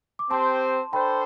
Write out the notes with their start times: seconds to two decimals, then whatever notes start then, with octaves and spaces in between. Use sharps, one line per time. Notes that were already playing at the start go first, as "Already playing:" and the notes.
0.19 D6
0.30 C4 G4 C5 A5 C6
0.93 D4 A4 C5 G5 B5